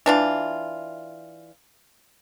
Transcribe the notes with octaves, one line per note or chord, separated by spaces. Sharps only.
E3 D4 F4